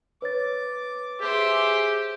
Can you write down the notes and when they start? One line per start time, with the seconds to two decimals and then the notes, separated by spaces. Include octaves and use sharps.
0.22 B4 C#5 D6 A6
1.21 G4 G#4 C5 E5